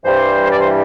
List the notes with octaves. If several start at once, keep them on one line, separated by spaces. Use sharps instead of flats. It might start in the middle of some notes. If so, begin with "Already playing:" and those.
G2 E3 G3 C5
D5
C5